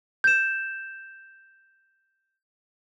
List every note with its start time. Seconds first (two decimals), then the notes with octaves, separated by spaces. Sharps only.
0.24 G6 E7